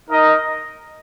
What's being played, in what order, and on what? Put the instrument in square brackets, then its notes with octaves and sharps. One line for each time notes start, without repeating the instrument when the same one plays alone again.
[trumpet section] D#4 A#4 D#5